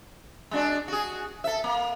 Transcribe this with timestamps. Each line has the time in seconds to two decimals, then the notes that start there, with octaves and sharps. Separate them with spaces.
0.51 G#3 D4 F#4
0.88 F#4 G#4
1.44 A4 E5
1.64 A#3